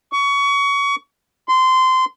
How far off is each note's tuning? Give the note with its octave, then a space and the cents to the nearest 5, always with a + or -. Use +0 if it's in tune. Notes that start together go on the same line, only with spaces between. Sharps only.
C#6 +25
C6 -20